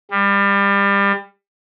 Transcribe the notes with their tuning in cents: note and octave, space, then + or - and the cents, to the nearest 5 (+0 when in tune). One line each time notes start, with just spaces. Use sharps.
G3 +30